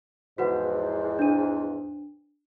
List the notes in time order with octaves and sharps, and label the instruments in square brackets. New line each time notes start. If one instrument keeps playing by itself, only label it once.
[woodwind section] E2 G#2 F3 [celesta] F#4 B4 F#5
[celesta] D4 D#7